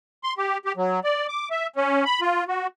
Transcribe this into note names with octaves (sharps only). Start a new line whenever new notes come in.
C6
G4
G4
F#3
D5
D6
E5
C#4
B5
F4
F#4